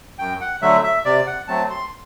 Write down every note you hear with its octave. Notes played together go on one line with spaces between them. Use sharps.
F#2 G5
F#5
D3 F#3 A3 E5
E5
C3 D5
F#5
F#3 A3 C4 A5
C6